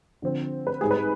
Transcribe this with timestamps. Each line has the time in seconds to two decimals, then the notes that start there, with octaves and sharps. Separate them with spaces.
0.22 D3 F3 C4
0.67 B4
0.81 G#2 G3 C4 G#4
0.91 B4